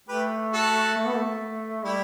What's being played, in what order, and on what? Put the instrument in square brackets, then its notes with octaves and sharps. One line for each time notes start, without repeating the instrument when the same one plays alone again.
[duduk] A3 [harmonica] G4 B4
[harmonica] F#4 A4
[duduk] A3
B3
A3
[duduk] G3 [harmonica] E4 G4